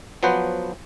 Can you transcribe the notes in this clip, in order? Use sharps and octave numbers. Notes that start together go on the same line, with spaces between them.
F3 F#3 B3 B4 C5